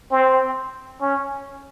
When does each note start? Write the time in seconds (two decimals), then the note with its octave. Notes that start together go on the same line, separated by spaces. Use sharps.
0.11 C4
1.02 C#4